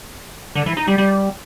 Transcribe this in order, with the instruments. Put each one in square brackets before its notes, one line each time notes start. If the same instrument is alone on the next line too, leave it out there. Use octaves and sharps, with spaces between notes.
[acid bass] D3
E3
D#4
G3
G3